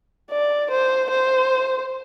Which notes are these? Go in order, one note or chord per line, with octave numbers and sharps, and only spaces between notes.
D5
C5
C5